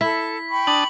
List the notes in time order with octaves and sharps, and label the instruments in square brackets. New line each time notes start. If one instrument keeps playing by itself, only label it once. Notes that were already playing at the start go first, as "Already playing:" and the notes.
[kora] E4 [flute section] A4 [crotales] B6
[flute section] G5 B5 C#6
[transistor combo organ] D4 A5 D#6 [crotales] F#7